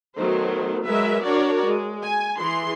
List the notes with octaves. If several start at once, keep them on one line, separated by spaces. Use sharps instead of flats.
D#3 F#3 A3 B3 C5
F#3 G#3 A#4 B4 E5
D4 F#4 A#4 C#5 D5
G#3
G#5
E3 G#4 C6